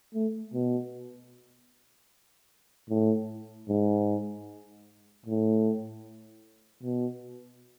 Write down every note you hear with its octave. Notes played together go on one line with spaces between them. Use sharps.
A3
B2
A2
G#2
A2
B2